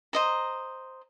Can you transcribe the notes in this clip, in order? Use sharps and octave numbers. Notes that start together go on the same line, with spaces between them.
C5 D#5 A#5